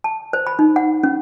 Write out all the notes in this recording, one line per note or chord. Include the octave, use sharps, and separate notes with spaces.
A5
C5
B5
D#4
F#5
C#4